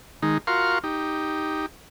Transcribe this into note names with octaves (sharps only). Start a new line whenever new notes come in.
D#3 G#3 D#4
F4 F#4 A#4 F5 C6 C#6
D#4 G4